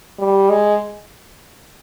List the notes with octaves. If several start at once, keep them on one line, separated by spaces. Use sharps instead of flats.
G3
G#3